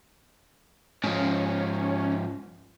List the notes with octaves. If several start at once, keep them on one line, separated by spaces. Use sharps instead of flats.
G#2 F3 C#4